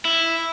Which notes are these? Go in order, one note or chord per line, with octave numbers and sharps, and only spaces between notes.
E4